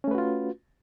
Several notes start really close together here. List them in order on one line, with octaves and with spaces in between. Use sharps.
C#4 A3 B4 F#4 F4